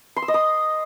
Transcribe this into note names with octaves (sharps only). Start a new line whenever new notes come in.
C6
E6
D#5
D#6